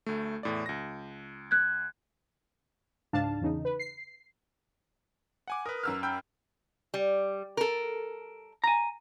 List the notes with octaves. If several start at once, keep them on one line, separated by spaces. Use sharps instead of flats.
D2 A3
E2 A2 D5
C#2 A#6
F#6 G#6
C#2 G#2 D4 F5 A5
E2 C#3 D#4
B4
C7
F#5 G#5 D6
A#4 B4 D#6
F#2 E6 F6
G5 B5 G6
G3
A4 A#4
G#5 A#5